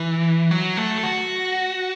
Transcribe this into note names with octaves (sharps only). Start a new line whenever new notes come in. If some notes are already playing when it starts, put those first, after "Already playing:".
Already playing: E3
F#3
A3
A4
F#4